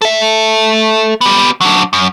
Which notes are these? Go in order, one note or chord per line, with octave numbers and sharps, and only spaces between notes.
A4 E5
B3 G4
F#3 D4
F#2